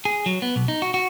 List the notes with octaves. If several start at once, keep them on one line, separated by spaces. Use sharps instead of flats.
G#4
F#3
B3
B1
D#4
F#4
F#4